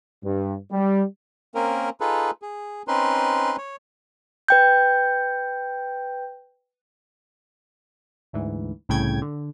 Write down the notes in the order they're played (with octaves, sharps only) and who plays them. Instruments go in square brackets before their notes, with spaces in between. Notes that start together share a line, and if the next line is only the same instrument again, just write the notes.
[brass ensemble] G2
G3
[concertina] A#3 C4 C#4 A#4
D#4 F4 G#4 A4 B4
G#4
C4 C#4 D#4 B4 C6
C#5
[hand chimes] B4 G5 G6
[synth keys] D2 G#2 E3
C2 A2 C#3 G5 G#6
D3